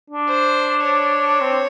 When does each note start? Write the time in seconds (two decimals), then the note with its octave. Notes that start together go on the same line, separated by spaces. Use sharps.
0.10 D4
0.29 C5
0.84 C#5
1.40 C4